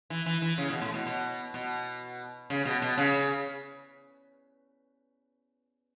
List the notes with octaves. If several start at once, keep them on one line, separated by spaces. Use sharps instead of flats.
E3
E3
E3
C#3
B2
A2
B2
B2
B2
C#3
B2
B2
C#3